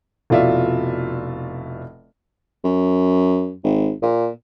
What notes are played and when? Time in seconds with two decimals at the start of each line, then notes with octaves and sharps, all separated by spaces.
0.30 F1 B2 E4 F4 D5 E5
2.64 F#2
3.64 G#1
4.02 A#2